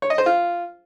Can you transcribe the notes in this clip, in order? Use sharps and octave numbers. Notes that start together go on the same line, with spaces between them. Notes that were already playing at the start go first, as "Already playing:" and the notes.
C#5
D#5
C5
F4